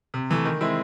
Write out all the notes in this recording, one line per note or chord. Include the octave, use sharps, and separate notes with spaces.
C3
E3 A3
D#3
G#3 C4 E4